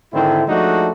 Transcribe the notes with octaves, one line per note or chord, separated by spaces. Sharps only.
G#2 D3 D#3 C4 E4
F3 G#3 A3 D4 D#4 F#4